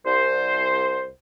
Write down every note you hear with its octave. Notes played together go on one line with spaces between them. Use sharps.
C2 C5